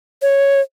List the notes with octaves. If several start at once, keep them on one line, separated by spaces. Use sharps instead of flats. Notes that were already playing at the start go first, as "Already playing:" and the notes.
C#5